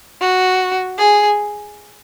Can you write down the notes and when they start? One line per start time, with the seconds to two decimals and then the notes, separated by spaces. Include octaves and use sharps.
0.21 F#4
0.98 G#4